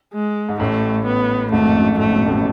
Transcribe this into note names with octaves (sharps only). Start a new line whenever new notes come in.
G#3
G#2
A1 A2 A3
B3
G#1 G#2 A3
F2
F#2
A2 A3
B2
A1 A2